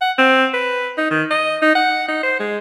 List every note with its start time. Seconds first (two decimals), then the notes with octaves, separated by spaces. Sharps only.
0.01 F#5
0.18 C4
0.54 B4
0.98 D#4
1.11 D#3
1.30 D#5
1.62 D#4
1.76 F#5
2.08 D#4
2.23 C5
2.40 G#3